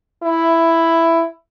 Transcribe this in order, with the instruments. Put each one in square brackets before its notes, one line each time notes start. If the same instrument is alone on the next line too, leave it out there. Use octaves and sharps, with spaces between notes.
[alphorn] E4